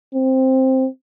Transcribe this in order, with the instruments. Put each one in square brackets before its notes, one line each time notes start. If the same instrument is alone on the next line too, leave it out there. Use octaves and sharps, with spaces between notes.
[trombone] C4